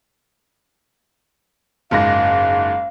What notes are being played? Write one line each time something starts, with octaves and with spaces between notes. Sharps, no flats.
F#1 G#2 F5 A#6